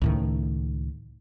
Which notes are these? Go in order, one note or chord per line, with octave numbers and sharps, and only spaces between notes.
C#2 A2 D#3